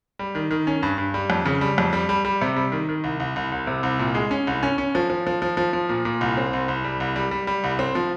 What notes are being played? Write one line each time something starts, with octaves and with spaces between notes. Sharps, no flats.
G3
D#3
D#3
C#4
G2
G2
G3
F2
C#3
G3
F2
G3
G3
G3
C3
G3
D#3
D#3
C2
C2
C2
C2
C3
C2
A#2
G#3
C#4
C2
C#4
C#4
F3
F3
F3
F3
F3
F3
A#2
A#2
C2
C4
C2
C2
G3
C2
G3
G3
G3
C2
C4
F3